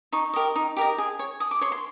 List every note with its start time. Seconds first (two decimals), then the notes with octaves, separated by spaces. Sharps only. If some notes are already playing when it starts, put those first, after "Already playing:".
0.12 D#4 C#6
0.34 G4 A#4 D#5
0.56 D#4
0.77 G4 A#4 D#5
0.98 G#4
1.19 C#5
1.40 G#4 D#6
1.51 D6
1.61 C#5 C6
1.72 C6